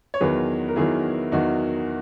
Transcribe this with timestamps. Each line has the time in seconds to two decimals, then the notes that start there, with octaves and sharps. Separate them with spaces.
0.14 C#5
0.21 E2 D#3 F#3 G#4 B4
0.68 A#4
0.76 E2 D#3 F#3 E4 G#4
1.32 E2 D#3 F#3 D#4 F#4